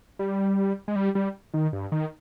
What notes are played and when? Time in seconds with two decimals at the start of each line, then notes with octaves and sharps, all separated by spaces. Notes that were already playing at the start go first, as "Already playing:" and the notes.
0.19 G3
0.88 G#3
0.96 G3
1.15 G3
1.54 D#3
1.73 G2
1.92 D#3